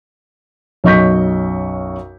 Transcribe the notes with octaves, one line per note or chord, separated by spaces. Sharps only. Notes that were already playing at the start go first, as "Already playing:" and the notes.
B1 F#2 D#5 C#6 G6 B6